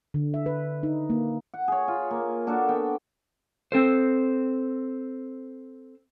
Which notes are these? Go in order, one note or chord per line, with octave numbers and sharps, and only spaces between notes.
D3
E5
B4
D#4
A#3
F#5
G#4 C#5
F4
A#3
A#3 D4 F#4 A4
B3 G5
C4 A4 C5